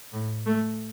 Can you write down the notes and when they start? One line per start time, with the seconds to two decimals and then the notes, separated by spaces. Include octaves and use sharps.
0.13 A2
0.46 A3